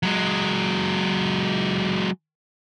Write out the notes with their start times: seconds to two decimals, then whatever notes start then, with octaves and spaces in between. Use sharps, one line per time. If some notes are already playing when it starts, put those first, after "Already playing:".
0.03 F#3 G#3